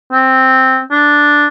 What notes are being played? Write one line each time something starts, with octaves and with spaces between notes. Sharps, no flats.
C4
D4